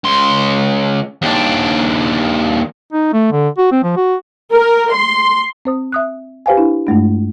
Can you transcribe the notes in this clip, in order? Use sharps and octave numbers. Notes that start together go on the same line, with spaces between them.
C#2 C6
D#2 D4
D#4
A3
D3
F#4
C4
F3
F#4
A#4
C6
C4 C5 D#6
E5 D#6 F#6
G4 B4 C5 F5 G5 G#5
D4 E4
G2 G#3 A3 D4